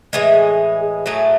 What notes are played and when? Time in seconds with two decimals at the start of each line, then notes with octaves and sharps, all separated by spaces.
0.13 A2 E3 G#3 G#4
1.06 A2 F#3 A3 G#4